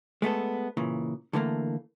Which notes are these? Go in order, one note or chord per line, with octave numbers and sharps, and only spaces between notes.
G#3 A3 B3 A4
A#2 C#3 E3
D3 E3 A3 A#3